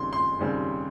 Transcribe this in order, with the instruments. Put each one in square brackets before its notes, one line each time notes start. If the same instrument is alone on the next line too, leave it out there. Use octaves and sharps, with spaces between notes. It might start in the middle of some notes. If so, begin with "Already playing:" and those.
Already playing: [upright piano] D#2 C#3 G3 C4 C6
C6
D#2 C#3 G3 C4